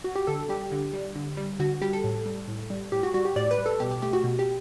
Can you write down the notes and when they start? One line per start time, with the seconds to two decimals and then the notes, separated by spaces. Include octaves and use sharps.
0.04 F#4
0.16 G4
0.27 D3 A4
0.49 G3 G4
0.72 D3
0.93 G3
1.16 D3
1.37 G3
1.60 D3 F#4
1.82 G3 G4
1.93 A4
2.04 A2
2.26 G3
2.48 A2
2.70 G3
2.92 A2 G4
3.03 F#4
3.14 G3 F#4
3.25 G4
3.36 A2 D5
3.51 B4
3.58 G3
3.66 A4
3.80 B2 G4
3.91 G4
4.02 A3 G4
4.13 F#4
4.24 B2
4.39 G4